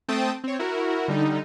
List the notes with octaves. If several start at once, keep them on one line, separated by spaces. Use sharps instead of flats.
A3 C4 G5 A5 D#6
C4 C#5
E4 F#4 A#4
D3 G3 D#4